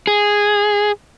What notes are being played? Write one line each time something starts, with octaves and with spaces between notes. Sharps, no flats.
G#4